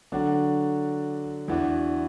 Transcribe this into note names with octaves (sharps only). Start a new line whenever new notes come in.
D3 F#3 D4 F#4
E2 E3 D4 F#4